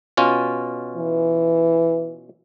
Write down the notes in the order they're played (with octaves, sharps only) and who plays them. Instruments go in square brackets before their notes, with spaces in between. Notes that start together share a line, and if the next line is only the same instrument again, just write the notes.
[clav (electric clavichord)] B2 C#4 F4
[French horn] E3